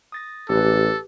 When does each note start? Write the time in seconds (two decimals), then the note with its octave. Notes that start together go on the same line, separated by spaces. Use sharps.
0.12 D#6 A6 A#6
0.49 A1 G4 A4 B4